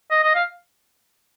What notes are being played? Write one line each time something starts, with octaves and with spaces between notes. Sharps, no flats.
D#5
D#5
F5